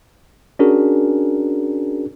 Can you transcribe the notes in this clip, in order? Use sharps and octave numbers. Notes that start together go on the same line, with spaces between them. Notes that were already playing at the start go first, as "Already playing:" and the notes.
C#4 D4 F#4 G#4 A#4